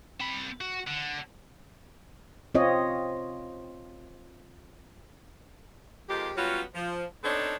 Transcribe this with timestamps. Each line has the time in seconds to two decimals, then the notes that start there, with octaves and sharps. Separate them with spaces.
0.20 C4 B5
0.61 F#4
0.87 D3
2.55 C4 F4 C#5 D#5
6.08 F2 D#3 G#3 F4 G4
6.36 F#3 G3 B3 C#4 F4 F#4
6.74 F3
7.24 B3 C4 D4 D#4 A4 C#5